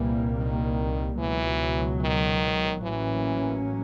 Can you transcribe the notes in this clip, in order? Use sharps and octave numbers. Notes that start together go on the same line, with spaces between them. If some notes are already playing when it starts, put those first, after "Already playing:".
Already playing: C2 A#2 E3 G3 A#3
D#3
C#2 B2 E3 F#3
D#3
A1 A2 E3 F#3 A#3 C#4